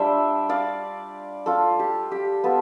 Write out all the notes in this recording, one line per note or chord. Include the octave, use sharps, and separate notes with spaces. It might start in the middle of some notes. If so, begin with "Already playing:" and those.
Already playing: G3 D4 F4 C5 D5 E5
D5 F5
F4 A4
G4
G4
B3 F4 A4